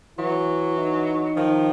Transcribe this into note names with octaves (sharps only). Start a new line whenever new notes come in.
E3 F#3 E4
D#4
D#3 F3